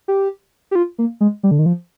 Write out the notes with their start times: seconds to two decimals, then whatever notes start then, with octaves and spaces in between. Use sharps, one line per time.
0.08 G4
0.71 G4
0.75 F4
0.98 A#3
1.21 G#3
1.43 G3
1.51 D3
1.59 D#3
1.66 F3